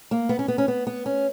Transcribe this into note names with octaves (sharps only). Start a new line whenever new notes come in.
A#3
B3
C#4
B3
C#4
B3
B3
C#4